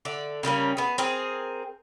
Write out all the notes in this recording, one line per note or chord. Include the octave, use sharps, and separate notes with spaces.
D3 D5 E5
C#3 G3 A#3 C#4
B3 G#4
C4 G#4 A#4